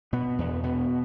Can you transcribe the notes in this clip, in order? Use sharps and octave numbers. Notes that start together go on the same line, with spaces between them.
B2 B3
E2
B2 B3